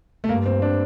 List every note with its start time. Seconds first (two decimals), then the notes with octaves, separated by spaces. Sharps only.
0.24 A3
0.29 G2 A#3
0.46 C4
0.62 D4